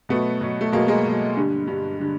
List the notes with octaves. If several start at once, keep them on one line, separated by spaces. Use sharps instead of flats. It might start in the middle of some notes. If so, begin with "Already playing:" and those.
B2 F#3 A3 B3
B2 F#3
A3
B2 F#3 G#3 A#3
G#3 A#3
B2 F#3
G2 D3 G3
G2 D3 G3
D3 G3